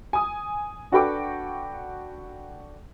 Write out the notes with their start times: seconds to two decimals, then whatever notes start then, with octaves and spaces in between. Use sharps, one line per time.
0.13 G#5 D#6
0.92 D4 F#4 A4 B4 G5 D6